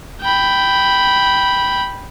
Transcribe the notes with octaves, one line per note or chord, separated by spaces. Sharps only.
G5 B5